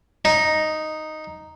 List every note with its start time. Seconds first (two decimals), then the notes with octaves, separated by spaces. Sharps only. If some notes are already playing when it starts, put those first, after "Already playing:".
0.25 D#4